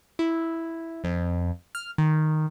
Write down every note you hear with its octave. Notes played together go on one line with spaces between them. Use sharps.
E4
F2
F6
D#3